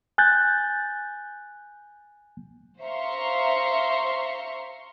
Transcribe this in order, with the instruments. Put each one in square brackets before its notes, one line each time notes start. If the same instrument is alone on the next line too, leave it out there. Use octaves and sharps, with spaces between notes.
[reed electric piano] G#5 F#6 G6 A6
[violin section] C5 E5 F5 A#5 C6 C#6